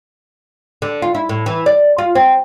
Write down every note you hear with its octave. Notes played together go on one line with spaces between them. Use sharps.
D3
F4
E4
A2
E3
D5
F4
C4